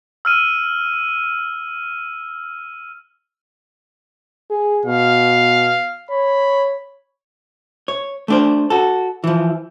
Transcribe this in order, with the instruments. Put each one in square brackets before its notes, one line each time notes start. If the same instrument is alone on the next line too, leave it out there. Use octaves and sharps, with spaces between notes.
[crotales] E6 F6 D#7
[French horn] G#4
[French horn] B2 [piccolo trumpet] F5
[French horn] C#5 [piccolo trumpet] B5
[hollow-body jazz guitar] C#5
A3 D4 C5
F#4 A4
E3 F3